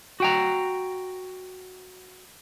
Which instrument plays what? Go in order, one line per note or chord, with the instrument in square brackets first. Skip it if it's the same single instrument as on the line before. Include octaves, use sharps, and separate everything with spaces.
[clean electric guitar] F#4 G5 A#5